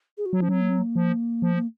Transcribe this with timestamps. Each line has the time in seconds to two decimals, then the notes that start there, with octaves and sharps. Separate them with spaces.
0.17 G#4
0.25 F#4
0.33 F#3
0.40 F3 C#4
0.49 F#3 C4
0.61 A#3
0.69 C4
0.78 A#3
0.96 F3
1.42 F3
1.55 A#3